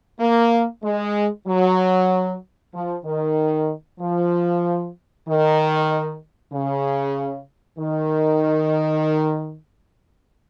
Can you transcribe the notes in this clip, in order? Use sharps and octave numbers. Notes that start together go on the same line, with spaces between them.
A#3
G#3
F#3
F3
D#3
F3
D#3
C#3
D#3